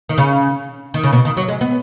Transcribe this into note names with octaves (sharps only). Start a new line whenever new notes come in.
D#3
C#3
D#3
C#3
B2
D#3
F#3
G#3
B3